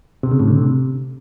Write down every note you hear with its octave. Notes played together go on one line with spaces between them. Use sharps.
C3
C#3
A2
D3
C3